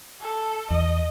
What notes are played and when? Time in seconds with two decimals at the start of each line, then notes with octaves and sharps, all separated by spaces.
0.21 A4
0.70 E2 D#5